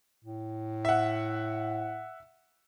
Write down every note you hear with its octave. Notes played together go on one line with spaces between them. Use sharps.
A2
E5 F#5